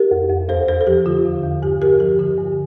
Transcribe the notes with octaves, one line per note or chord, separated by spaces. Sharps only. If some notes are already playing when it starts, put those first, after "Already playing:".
Already playing: G4 A#4
F2
F2
E2 A4 C5
E2 A4 C5
A4
F3 G4
D3 F4
E2
E2
G2 G4
G2 G4 A#4
F3 G4
D3 G4
G2